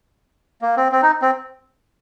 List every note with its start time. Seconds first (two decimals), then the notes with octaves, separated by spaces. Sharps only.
0.62 A#3
0.77 C4
0.92 C4
1.02 D#4
1.22 C4